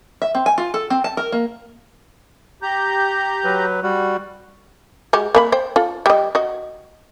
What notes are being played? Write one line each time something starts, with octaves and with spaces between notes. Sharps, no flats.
E5
C4
G#5
F4
A4
C4
A5
A#4
A#3
G4 A#5 G6
F#3 B4
G3 F#4
G#3 F#4 G4
A#3 A#4 B5
C5 G5
F4 A4
G3 D#5
F#4 D#5